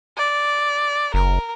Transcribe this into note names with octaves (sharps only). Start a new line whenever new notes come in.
D5
F#1 A#4